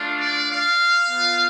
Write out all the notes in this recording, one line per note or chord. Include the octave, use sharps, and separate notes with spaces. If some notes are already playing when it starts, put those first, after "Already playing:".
Already playing: A3 D4 F4
D5
F5
B3 F4